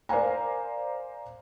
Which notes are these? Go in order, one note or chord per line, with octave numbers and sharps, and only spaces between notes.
A#4 C5 D5 F5 G#5 A#5